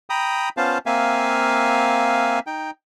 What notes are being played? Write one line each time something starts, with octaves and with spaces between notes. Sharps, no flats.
G5 A#5 B5 D#6
B3 C#4 F4 C5 F5 A5
A#3 C4 E5 F5 G#5
D#4 G5